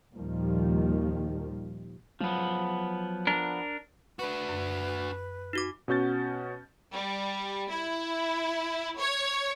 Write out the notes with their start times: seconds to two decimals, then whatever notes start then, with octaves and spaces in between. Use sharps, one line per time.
0.13 D#2 A#2 D#3 F3 G3 A#3
2.21 F3 F#3 B3
3.27 D4 A#4
4.19 D4 F#4 B4
4.49 F#2
5.53 D#4 F#4 D6
5.88 B2 C#4 F#4 G6 A6
6.94 G3
7.70 E4
8.99 C#5